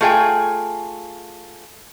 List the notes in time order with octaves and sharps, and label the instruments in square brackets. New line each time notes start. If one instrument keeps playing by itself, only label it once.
[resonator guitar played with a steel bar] A3 F4 G#4 E5 G5 G#5